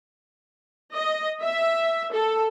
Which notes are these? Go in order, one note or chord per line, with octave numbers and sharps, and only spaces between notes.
D#5
E5
A4